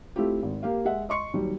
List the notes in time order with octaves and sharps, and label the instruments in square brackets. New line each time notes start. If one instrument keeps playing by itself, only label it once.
[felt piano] A3 C4 E4 F4 G4
G#1
A#3 G4 F5
G#3 E5 F#5
D#5 C6 C#6 C#7
D#2 F#3 G3